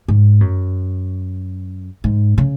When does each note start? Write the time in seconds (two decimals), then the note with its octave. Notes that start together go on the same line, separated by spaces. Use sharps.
0.08 G#2
0.41 F#2
2.04 G#2
2.38 C#3